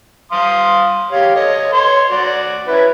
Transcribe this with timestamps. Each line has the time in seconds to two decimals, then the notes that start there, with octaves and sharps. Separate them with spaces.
0.32 F5 C6 D#6
1.11 G4 C#5 F5
1.35 A4 C#5 D#5
1.73 C#5 C6
2.10 F#4 D5
2.67 C#4 E4 B4